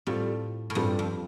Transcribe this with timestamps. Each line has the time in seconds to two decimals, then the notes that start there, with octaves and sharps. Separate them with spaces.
0.07 A2 G3 C4 F4 A4
0.70 A2
0.75 G2 G3 C4 F4 A4
0.99 F2